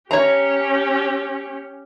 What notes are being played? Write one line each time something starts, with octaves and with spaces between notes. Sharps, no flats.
C#4 G4 C#5 A#5